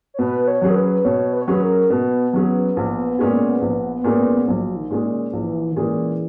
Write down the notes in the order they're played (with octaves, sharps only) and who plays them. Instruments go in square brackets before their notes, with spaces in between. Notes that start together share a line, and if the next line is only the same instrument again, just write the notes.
[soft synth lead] C#5
[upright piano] B2 [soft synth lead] B4
[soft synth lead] C#5
[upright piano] F#3 C#4 G#4
[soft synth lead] A#4
B4
[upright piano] B2 [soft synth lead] C#5
[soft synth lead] B4
C#5
[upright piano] F#3 C#4 G#4 [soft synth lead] B4
[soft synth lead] A#4
[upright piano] B2 [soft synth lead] B3
[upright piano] F#3 C#4 G#4
A#1
A#2 G#3 C#4 G#4
A#1
A#2 G#3 C#4 G#4
[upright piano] A#1 [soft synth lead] F#3
[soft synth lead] D#3
[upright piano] A#2 G#3 C#4 G#4
[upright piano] A#1 [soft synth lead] E3
[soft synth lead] D#3
[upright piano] A#2 G#3 C#4 G#4 [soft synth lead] E3